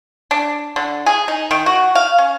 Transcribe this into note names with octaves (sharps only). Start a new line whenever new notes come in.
D4
D3
G#4
D#4
D#3
F#4
F5
C#4